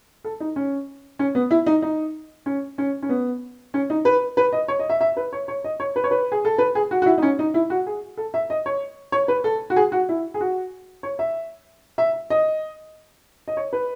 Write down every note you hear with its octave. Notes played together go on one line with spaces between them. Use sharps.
A4
D#4
C#4
C#4
B3
E4
D#4
D#4
C#4
C#4
C#4
B3
C#4
D#4
B4
B4
D#5
C#5
D#5
E5
E5
B4
C#5
C#5
D#5
C#5
B4
C#5
B4
G#4
A4
B4
G#4
F#4
F#4
E4
D#4
C#4
D#4
E4
F#4
G#4
A4
E5
D#5
C#5
C#5
B4
A4
F#4
G#4
F#4
E4
G#4
F#4
C#5
E5
E5
D#5
D#5
C#5
B4